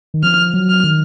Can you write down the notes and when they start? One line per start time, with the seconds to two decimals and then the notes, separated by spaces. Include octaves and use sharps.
0.14 D#3
0.23 F3 F6
0.54 F#3
0.70 F6
0.84 D#3